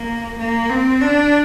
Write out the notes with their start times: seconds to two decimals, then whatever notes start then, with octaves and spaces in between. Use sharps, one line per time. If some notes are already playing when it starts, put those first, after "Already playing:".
Already playing: A#3
0.38 A#3
0.70 C4
1.01 D4